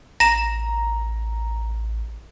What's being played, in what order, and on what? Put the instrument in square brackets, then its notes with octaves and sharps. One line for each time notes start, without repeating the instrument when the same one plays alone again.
[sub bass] A1 [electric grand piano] A#5 [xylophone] A#6 E7